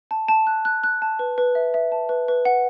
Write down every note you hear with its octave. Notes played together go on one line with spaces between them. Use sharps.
A5
A5
F#6
F#6
F#6
A5
B4
B4
E5
E5
A5
B4
B4
F#5